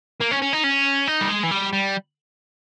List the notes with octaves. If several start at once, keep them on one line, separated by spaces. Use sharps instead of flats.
A#3
C#4
C#4
D#4
C#4
D#4
G3
G#3
E3
G3
G3